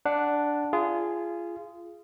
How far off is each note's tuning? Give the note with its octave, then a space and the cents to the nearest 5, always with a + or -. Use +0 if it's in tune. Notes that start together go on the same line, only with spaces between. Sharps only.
D4 +0 F#5 +0
F4 -25 G#4 +0